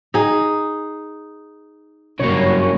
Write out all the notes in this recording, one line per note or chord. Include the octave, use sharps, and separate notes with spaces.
D#4 G#4
F#1 G2 C#3 A#3 C#5